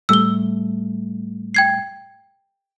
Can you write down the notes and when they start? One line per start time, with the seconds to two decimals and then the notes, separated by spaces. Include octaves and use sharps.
0.09 A2 G3 A3 E6 G7
1.55 G5 G#6 C7